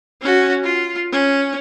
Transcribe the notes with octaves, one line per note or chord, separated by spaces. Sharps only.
C#4 F#4
F4
C#4